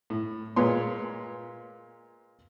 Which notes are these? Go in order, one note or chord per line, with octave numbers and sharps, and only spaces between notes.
A2
A#2 G#3 B4 C#5 C6